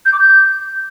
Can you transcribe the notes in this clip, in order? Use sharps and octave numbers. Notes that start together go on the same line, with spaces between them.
G6
D6
G6